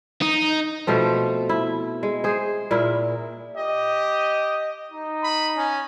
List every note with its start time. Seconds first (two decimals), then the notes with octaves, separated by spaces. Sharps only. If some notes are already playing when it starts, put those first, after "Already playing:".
0.22 D#4
0.87 B2 F3 A3 C4
1.49 E4
2.03 G#3
2.24 G#4 C5
2.71 A#2 E4 A#4
3.57 G4 D#5
4.91 D#4
5.23 B5
5.56 C#4